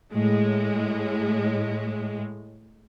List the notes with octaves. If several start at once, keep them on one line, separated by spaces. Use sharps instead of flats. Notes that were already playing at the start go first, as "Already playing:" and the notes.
A2 G#3